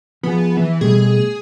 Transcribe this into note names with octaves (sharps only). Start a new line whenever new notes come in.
F3 B3 G#4
E3
B2 G3 A3 G#4